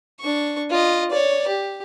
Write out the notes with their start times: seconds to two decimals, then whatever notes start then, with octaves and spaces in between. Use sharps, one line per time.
0.20 D4 C#6
0.71 F4 D#5
1.11 C#5 D5
1.47 G4